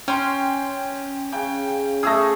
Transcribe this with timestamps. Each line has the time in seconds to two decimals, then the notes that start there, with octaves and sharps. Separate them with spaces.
0.08 C#4 G5 C6
1.33 C#3 G5
2.03 A3 G#4 D#6 E6 A#6